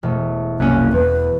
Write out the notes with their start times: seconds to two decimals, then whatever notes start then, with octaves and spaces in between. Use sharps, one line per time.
0.03 E1 A3
0.60 C2 F#2 A#3 C#4 F#6
0.93 E2 B4